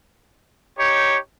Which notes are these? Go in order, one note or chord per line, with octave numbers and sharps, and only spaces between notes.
D#4 G4 C#5